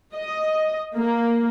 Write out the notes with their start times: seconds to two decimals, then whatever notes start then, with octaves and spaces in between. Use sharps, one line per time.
0.15 D#5
0.97 A#3